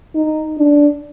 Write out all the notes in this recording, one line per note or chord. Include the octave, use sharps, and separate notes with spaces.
D#4
D4